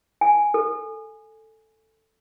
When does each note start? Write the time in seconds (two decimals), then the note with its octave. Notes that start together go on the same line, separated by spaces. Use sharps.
0.21 G#5
0.54 A4